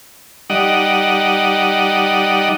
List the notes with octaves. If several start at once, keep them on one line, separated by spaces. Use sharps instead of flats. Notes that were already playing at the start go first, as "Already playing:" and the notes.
G3 D#4 D5 D#5 F#5